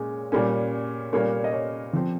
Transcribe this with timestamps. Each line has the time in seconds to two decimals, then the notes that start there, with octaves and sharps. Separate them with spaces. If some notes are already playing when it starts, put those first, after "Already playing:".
Already playing: A#2 G#3 C#4
0.32 A#2 G3 A#3 C#4
1.13 A#2 G3 A#3 C#4 C#5
1.44 D#5
1.53 C#5
1.93 F3 C4